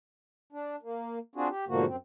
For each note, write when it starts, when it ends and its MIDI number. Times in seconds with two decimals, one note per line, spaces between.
0.53 0.76 62
0.82 1.19 58
1.36 1.48 60
1.36 1.48 62
1.36 1.48 65
1.36 1.48 66
1.36 1.48 68
1.49 1.65 67
1.68 1.85 44
1.68 1.85 47
1.68 1.85 50
1.68 1.85 53
1.68 1.85 58
1.68 1.85 66
1.87 1.96 42
1.87 1.96 60